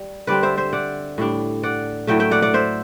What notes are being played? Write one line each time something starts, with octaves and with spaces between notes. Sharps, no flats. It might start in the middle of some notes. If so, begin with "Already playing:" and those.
Already playing: G3
D3 G3 C4 B4 D5
C5 E5
C5 E5
D5 F#5
A2 G3 D4
D5 F#5
A2 F#3 A3 E5 G5
E5 G5
D5 F#5
D5 F#5
C5 E5